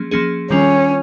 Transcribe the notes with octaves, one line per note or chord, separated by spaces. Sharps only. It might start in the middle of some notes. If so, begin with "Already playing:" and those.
Already playing: F3 A#3 C#4 G#4
F3 A#3 C#4 G#4
D#3 G3 C4 C#4 F4